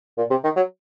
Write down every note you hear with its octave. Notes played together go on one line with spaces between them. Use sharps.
A#2
C3
D#3
F#3